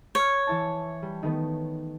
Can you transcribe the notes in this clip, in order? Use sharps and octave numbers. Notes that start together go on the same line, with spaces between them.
C#5 C#6 F6
E3 E4 A5
G3
D#3 A3 B3